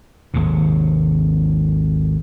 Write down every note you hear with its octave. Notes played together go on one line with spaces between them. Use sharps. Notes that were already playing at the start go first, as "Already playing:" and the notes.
G#1 D#2 G#2 C3